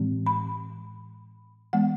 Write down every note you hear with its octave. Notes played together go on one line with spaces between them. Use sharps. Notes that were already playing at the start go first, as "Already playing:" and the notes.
Already playing: A2 E3 G#3 C4
B5
E3 G#3 B3 F#5